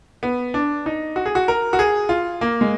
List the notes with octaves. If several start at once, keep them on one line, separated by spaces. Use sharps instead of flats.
B3
D4
D#4
F#4
G#4
F#4
A#4
F#4
G#4
F4
A#3
G#3